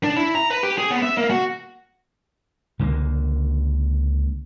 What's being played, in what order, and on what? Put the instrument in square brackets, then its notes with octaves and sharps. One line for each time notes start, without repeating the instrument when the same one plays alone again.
[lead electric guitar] D4
E4
A#5
B4
G4
G#4
B3
E5
A#3
F#4
[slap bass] C#2 D3 G3 A#3